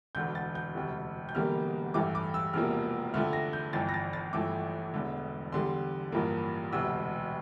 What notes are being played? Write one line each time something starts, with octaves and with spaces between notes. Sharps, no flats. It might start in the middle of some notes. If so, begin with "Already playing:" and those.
E1 D2 D3 G6
A6
G6
E1 D2 C3
G6
E1 E2 D3 G3 A#3 F6
A1 G2 E3 A3 D6
D6
E6
E1 E2 C3 F3 A#3 F6
F2 D3 A3 F6
A#6
G6
G1 F2 E3 A6
A#6
A6
A6
G1 F2 E3 A3 D6
E1 E2 D3 A3
E2 D3 G3 C6
A1 G2 F3 A#3
E1 D2 C3 E6